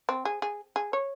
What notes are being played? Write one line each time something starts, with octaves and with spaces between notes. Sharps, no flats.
C4
G#4
G#4
G#4
C#5